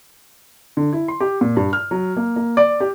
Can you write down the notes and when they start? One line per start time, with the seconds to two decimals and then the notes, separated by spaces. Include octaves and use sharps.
0.77 D3
0.93 E4
1.08 C6
1.20 G4
1.41 A#2
1.57 G2
1.73 F6
1.91 F#3
2.17 A#3
2.36 A#3
2.57 D5
2.80 G4